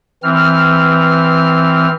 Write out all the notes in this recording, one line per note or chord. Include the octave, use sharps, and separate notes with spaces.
E3 C4 F6